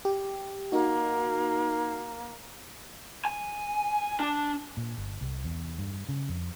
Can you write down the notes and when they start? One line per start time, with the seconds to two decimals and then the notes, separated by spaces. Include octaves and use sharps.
0.05 G4
0.72 A#3 D#4 F#4
3.25 G#5
4.20 D4
4.77 A#2
4.97 G1
5.21 C2
5.44 E2
5.78 G2
6.09 C#3
6.29 F2